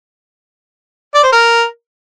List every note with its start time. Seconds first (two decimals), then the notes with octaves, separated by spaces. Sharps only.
1.15 D5
1.24 C5
1.32 A#4